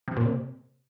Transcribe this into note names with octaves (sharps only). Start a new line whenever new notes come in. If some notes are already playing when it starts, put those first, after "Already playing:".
C3
A#2
C3